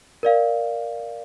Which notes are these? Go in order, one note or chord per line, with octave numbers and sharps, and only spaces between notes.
A#4 D5 F5